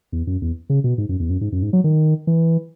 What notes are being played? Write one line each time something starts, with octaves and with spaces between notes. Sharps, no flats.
E2
F#2
E2
C#3
B2
G#2
F#2
E2
F#2
G#2
F#2
G#2
F#3
D#3
E3